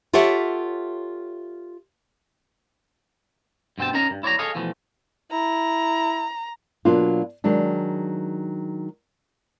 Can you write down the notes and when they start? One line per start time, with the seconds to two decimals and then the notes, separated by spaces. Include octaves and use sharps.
0.13 F4 G4 A4 C#5 E5 F#5
3.78 G2 B2 C4 G5 A5
3.94 C#4 D#4 A#4 A5 A#5
4.11 G2
4.23 E4 C#5 D5 F#5 A#5
4.39 G#4 A4 C#5 D#5 F5
4.55 B2 E3 F3 A3
5.32 E4 A#5
6.85 B2 F#3 A#3 D4 F4
7.44 D#3 F#3 G#3 D4